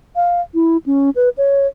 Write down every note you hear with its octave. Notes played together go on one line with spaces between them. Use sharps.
F5
E4
C#4
B4
C#5